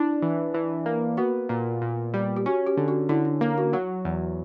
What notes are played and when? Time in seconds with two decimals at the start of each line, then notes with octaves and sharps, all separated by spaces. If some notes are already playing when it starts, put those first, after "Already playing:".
Already playing: D4 E4
0.22 E3
0.54 E3
0.86 A#3
1.17 B3 F#4
1.49 A#2
1.82 A#2
2.14 G3
2.37 G4
2.46 C#4 F#4
2.67 G4
2.77 D3
2.88 F#4
3.09 D3 E4
3.25 D4
3.41 A#3
3.58 F#4
3.73 F#3 F#4
4.05 E2